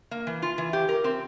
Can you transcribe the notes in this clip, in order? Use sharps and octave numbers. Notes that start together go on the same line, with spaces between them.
A#3
E3
F4
E3
G4
A#4
C4